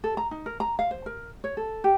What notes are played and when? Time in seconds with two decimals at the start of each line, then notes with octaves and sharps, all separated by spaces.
0.04 A4
0.17 A#5
0.31 D#4
0.46 A#4
0.60 A#5
0.79 F5
0.91 C5
1.06 A#4
1.44 C#5
1.57 A4
1.84 G4